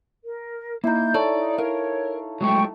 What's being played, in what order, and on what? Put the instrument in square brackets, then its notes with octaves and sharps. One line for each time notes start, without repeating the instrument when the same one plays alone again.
[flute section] A#4
[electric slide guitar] A#3 [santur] D#4 E4 [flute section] G6
[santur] A4 C#5 [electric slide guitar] D5
[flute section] D#4
[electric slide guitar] A#4 [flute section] C#5 [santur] F5
[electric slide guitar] F#3 G#3 A3 [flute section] G5 C#6